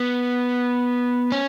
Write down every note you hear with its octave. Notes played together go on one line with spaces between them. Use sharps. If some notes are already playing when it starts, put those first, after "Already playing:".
Already playing: B3
C#4